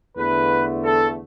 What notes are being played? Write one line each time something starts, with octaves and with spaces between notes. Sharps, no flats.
E2 D3 A3 B4
A4